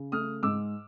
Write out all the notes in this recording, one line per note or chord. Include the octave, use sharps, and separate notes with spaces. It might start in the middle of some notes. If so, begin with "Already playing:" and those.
Already playing: C#3
A3 D#6 F6
G#2 D6 E6